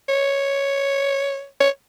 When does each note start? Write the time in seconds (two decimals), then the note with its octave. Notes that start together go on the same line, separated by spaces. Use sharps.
0.09 C#5
1.60 C#5